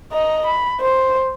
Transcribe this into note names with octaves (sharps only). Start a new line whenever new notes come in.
D#5 A#5
B5
C5